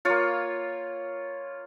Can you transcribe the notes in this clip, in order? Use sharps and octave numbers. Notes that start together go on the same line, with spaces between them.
A#3 F4 C#5